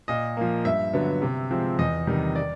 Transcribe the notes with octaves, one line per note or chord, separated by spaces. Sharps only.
A#2 D#5
F3 A#3
G2 E5
D3 F#3 B3
C3
F3 G#3 C4
E2 D#5
C3 D#3 G3
D5